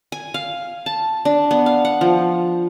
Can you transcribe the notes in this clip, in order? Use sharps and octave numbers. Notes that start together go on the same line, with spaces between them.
G#5
F5
A5
D4
B3
F5
F#5
F3